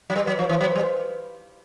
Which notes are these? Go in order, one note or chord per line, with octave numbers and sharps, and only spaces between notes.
F#3
G3 B4
F#3 B4
F3 C#5
E3 C5
F#3 C5
B4
G3
B4